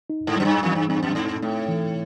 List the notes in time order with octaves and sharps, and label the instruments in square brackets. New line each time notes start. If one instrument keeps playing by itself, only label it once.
[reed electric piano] D#4
[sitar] G#2
[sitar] F#2 [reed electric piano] G3
[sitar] G2
[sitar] F2 [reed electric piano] E3
[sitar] G2
[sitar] G2 [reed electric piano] C4
[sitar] F#2
[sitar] G#2 [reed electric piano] D#4
[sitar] A2 [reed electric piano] A3
[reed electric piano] E3